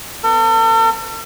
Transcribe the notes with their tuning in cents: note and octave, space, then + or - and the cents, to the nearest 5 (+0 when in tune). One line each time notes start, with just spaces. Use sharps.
B3 +25 A4 +45